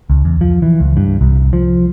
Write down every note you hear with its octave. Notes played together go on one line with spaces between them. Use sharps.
C#2
E2
F3
E3
C#2
G2
C2
F3